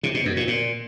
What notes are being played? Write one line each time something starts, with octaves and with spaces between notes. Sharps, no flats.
C3
B2
F#2
A#2
A#2